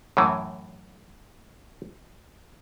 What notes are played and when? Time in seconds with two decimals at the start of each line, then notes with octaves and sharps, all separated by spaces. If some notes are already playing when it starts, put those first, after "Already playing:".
0.17 F#2 A2 E3